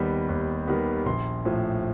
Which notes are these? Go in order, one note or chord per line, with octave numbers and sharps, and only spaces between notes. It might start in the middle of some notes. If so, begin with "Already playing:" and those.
Already playing: D#2 D#3 G3 B3
D#2
D#3 G3 B3
A#1 C6
A2 F3